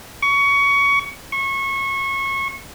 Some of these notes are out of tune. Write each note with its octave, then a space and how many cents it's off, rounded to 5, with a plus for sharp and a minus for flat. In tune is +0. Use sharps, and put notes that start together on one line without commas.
C#6 +20
C#6 -25